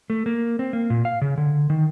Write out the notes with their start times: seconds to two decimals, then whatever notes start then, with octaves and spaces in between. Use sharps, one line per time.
0.10 A3
0.26 A#3
0.59 C4
0.73 A#3
0.90 A#2
1.05 F5
1.22 C#3
1.38 D3
1.70 D#3